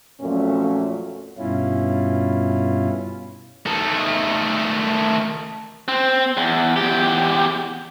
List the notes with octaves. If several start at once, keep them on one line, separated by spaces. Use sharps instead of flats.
F2 A#2 F#3 A3 C#4
G2 B2 C#4 E4 F4
D#3 A3
C4
E2
E2 G4